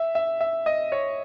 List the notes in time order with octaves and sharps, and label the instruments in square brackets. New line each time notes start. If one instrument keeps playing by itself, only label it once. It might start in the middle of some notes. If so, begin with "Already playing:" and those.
Already playing: [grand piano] E5
E5
E5
D#5
C#5